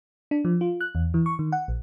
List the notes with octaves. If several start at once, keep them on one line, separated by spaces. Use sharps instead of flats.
D4
F3
F4
F#6
E2
E3
C#6
D#3
F#5
A#1